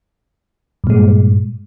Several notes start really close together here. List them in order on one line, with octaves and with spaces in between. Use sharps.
G2 A#2 G#3